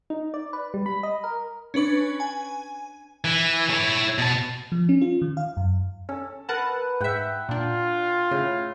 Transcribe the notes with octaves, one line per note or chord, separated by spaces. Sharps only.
D#4
D5
B4
G3
B5
D#5
A#4
C#4 D4 B4 C#6
G#5
E3
E4 C#5
B2 A5
F3
C#4
F4
D#3
F5
F#2
C#4 A4
A#4 B4 F#5 A5
G#2 E5 F#5 G5
A#2 D4 F4
A2 C#3